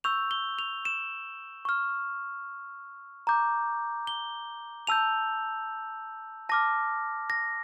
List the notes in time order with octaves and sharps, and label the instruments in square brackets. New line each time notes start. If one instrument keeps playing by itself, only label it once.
[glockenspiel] C#6 E6 G6 F7
G7
F7
E7
C#6 F6
A#5 D6 G6
G7
A5 E6 G6 F7
A5 D6 F6 A#6
A#6